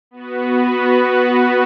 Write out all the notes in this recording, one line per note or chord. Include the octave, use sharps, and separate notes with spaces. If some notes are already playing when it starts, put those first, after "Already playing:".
B3 F#4 B4